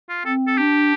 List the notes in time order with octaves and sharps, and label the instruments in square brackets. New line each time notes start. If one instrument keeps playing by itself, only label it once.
[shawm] F4
[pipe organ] C4 [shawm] A4
[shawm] A4
[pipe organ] D4 [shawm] G4